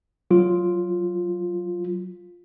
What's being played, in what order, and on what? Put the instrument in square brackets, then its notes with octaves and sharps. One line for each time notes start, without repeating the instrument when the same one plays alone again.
[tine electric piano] F#3 F4